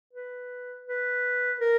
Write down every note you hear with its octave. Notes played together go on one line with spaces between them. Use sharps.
B4
B4
A#4